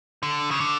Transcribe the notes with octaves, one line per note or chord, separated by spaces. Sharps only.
D3
C#3
D3